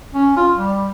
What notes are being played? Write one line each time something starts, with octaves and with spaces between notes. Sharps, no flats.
C#4
F4
G3